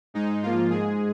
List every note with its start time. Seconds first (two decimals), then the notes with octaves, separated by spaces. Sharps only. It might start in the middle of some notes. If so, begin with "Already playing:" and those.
0.14 G#2 G#3 D#4
0.42 G#2 F3 A#3 F4
0.71 G#2 G#3 G#4